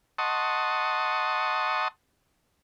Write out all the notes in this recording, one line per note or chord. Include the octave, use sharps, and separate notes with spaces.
D#5 F#5 A5 C6 C#6 D#6